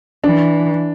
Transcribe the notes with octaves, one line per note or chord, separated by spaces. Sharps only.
E3 D4